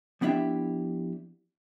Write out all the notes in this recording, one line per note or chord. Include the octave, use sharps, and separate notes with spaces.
F3 B3 D4 E4 G4 E5